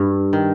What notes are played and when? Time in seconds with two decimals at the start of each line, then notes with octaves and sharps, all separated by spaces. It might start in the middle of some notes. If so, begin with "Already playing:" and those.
Already playing: G2
0.33 D#3